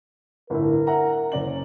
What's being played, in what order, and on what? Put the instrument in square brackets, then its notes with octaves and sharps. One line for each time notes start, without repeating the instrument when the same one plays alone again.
[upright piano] G1 A2 E4 [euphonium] A#4
[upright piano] E5 F#5 A#5
[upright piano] F#1 D5 F#7 [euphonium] C#4